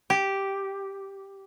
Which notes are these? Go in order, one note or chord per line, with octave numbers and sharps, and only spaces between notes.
G4